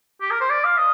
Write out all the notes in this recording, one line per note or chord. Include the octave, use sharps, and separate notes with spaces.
G4
A#4
C5
D5
F5
D#5